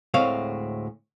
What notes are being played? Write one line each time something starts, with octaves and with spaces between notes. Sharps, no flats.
D2 A2 G#3 C4 C#5 F5